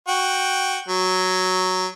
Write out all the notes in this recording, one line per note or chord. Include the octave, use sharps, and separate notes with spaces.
F#4 G5
F#3